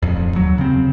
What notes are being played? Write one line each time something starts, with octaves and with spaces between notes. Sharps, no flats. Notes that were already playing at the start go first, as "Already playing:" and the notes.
D1 F2
D#2 F#3
C#3 C4